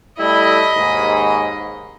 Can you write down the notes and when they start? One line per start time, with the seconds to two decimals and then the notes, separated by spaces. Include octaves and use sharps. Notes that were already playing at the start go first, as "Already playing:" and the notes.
0.19 G3 A3 E4 D#5 B5
0.76 D#2 G#2